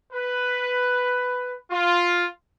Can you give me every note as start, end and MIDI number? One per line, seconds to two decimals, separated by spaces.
0.13 1.54 71
1.71 2.25 65